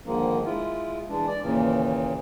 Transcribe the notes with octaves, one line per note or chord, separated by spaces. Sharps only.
G#2 D3 D#3 F3 G#3 A#3
G#3 E4 F4
E3 G#3 D4
D5
D#2 A#2 C#3 E3